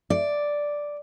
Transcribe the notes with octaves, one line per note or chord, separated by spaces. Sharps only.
D5